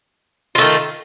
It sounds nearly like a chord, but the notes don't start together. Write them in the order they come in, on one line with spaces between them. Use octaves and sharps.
F4 A3 D#3